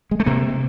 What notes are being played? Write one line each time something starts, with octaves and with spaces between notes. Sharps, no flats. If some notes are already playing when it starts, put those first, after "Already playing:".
G#3
A3
C3 A#3